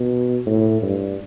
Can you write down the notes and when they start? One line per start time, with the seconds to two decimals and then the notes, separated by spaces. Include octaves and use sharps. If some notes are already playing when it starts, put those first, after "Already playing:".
Already playing: B2
0.46 A2
0.83 G2